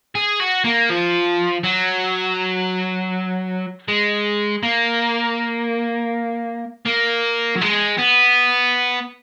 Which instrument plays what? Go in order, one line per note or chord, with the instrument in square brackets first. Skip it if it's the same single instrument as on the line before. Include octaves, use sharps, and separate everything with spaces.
[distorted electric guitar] G#4
F#4
A#3
F3
F#3
G#3
A#3
A#3
F#3
G#3
B3